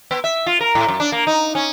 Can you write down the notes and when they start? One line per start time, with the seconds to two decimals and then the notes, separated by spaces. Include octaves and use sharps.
0.11 B3
0.24 E5
0.46 F4
0.61 A#4
0.75 A2
0.88 F#2
1.00 D4
1.12 A#3
1.27 D#4
1.55 C#4